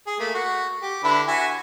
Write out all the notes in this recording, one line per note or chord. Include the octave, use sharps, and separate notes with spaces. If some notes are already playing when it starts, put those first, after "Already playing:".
G#4
A3 A#3
F#4
G4
D3 E4 B4
F#4 E5 G#5